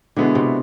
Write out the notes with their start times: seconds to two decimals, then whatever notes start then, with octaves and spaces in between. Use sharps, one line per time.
0.16 B2 D3 G#3 B3 E4 G#4
0.35 C3